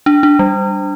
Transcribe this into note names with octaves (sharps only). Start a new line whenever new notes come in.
D4
D4
G3